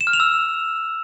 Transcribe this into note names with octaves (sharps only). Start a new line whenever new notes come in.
E7
F6
F7
E6